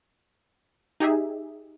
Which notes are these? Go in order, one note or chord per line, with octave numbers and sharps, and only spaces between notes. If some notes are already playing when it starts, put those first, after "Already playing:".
D#4 G4 G#4 E5